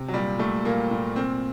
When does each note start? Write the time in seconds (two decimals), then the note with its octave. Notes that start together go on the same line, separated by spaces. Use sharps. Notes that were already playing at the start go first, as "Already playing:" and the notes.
Already playing: C3
0.08 F#3
0.14 A#2 G3
0.39 A#2 A3
0.65 A#2 A#3
0.91 A#2
1.16 A#2 C4